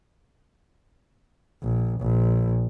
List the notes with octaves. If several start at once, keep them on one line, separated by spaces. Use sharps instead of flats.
A#1
A#1